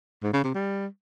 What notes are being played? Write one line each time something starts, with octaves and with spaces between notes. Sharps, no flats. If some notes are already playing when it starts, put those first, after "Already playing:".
G#2
C#3
C3
G3